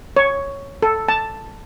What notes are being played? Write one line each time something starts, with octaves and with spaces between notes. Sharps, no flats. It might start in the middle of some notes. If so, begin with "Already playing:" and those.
C#5
A4
A5